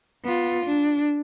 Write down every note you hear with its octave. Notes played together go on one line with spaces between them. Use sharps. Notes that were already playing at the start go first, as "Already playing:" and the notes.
B3 F4
D4